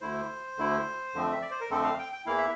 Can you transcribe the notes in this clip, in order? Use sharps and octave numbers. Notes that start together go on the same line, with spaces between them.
D2 D3 A3 E4 C5
D2 D3 A3 E4
F2 D3 F3 A3 C4
E5
D5
C5
A#4
F2 D3 F3 A3 C4 A4
F5
G5
G5
E2 E3 A#3 E4 F5
E5